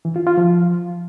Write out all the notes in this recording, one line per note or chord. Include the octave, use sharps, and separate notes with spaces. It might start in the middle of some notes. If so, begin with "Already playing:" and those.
E3
F4
F4
F3